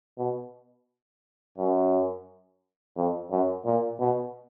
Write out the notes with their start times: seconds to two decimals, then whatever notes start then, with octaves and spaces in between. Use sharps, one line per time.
0.18 B2
1.58 F#2
2.97 F2
3.31 F#2
3.65 A#2
4.00 B2